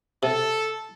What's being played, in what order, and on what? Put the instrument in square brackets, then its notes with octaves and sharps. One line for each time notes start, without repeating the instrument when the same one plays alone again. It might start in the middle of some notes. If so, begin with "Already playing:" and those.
[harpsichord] C3 [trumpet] A4